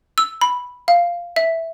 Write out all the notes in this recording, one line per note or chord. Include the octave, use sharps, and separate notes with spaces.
E6
B5
F5
E5